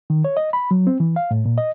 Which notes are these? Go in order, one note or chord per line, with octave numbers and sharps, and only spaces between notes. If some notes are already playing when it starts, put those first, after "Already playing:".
D#3
C#5
D#5
B5
F#3
C4
E3
F5
A2
A#2
D#5